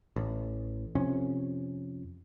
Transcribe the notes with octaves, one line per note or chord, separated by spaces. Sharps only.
A1
F2 C3 C#4